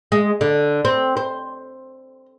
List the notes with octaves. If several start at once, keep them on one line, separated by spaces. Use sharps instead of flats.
G#3
D3
C4
C5